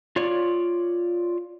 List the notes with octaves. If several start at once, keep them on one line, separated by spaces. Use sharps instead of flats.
F4 C#5 D5